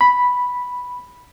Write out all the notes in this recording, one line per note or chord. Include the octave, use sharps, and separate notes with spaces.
B5